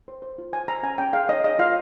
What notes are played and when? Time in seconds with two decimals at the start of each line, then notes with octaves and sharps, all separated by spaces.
0.08 C5
0.22 C5
0.38 F4
0.53 C5 G#5
0.68 C5 A#5
0.83 C#4 G#5
0.98 C#4 G5
1.13 G#4 F5
1.29 C#5 D#5
1.44 C#5 D#5
1.59 F4 F5